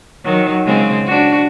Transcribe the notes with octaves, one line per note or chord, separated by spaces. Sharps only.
D#3 F#3
C#3 G#3 C4
D4 F#4